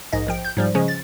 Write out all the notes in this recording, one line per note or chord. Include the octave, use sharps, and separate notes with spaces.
A#1 G#2 D#5
A#1 F3 G5
G6
G#2 F3 G3
C#3 F3 G#3 C#4
A6